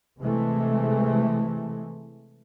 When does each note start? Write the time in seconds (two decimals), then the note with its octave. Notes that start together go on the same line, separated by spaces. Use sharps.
0.21 C3 E3 G#3 A3